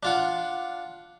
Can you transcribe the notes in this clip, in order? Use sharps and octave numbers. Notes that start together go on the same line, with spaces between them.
D4 F4 F#5